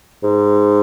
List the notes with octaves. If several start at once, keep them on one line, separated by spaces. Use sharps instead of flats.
G#2